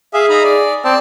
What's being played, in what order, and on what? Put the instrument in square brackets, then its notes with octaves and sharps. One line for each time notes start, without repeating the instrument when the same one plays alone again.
[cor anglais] G#4 [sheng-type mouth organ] E5 F5
[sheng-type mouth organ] D#4 A#5 B5
D5
[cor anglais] C4 [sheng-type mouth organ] D5 A5